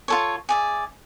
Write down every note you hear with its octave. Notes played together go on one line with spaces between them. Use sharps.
F4 A4 C#5
G#4 D5 E5